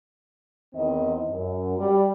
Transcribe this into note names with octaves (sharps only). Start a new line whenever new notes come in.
E2 D#3 C4 D#5
F#2
G3